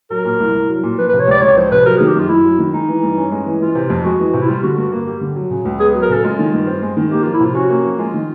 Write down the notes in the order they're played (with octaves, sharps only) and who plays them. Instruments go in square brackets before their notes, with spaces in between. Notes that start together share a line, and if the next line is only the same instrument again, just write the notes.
[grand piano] F#3 [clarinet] A#4
[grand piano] A#2
C2
C2
F#3
A#2
[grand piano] F3 [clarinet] B4
[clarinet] B4
[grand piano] C3
[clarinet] C#5
[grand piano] C#2 [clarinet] D5
[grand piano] C#2 [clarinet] C#5
[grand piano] F3 [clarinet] C5
[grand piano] C3 [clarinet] B4
[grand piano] F#3 [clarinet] A#4
[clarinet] G#4
[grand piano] D#3
[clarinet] G4
[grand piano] F#2 [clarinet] F4
[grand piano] F#2 [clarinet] E4
[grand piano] F#3
D#3
[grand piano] G#3 [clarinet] D#4
[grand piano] E3
G2
C#4
G#3
E3
[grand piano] E3 [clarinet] F4
[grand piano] C3
F2
[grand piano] G#3 [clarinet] F#4
[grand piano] E3
C3
[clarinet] E4
[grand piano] G3 [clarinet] F4
[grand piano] D3 [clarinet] F#4
[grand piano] G2 [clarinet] F#4
[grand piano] A#3
G3
D3
F#3
C#3
C#2
[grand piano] B3 [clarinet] G#4
[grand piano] F#3
[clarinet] A#4
[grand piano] C#3 [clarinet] A4
[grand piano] G#3 [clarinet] F4
[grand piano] D#3
G2
C4
G#3
D#3
[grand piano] A#3 [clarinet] G4
[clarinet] F4
[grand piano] F3
[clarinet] E4
[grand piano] C3 [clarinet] F4
[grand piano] C#4 [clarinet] F#4
[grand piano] A#3
F3
[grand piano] G#3 [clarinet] F4
[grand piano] D#3